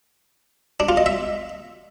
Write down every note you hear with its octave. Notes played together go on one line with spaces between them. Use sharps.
D4
F4
D#5
E5